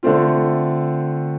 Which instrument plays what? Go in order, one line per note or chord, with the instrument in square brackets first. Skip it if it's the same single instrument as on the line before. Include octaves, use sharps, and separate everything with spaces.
[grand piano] D3 A3 C4 F4